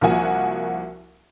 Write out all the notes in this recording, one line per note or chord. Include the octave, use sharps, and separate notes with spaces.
C2 F3 A#3 F#4 G#5